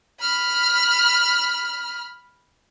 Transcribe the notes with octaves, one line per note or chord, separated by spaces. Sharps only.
B5 F6